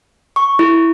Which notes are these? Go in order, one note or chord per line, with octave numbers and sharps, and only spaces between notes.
C#6
E4